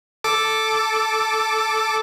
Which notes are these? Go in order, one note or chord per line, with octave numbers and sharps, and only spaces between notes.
A4 D6